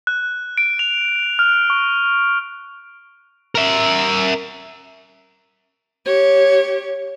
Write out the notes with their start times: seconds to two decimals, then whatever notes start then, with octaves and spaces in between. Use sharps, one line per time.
0.07 F#6
0.58 D7
0.79 F7
1.39 F6
1.70 C#6
3.55 A#4 E5
6.05 G4 C#5